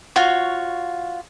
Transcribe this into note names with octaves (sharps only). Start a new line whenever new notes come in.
F4 F#4 C#5